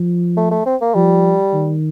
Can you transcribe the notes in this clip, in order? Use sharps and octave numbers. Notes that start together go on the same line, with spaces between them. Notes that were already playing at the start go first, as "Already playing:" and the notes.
Already playing: F3
A3
A3
C4
A#3
F3 G3
D#3